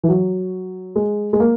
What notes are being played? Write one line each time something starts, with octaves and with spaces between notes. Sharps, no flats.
E3
F#3
G#3
G#3
A#3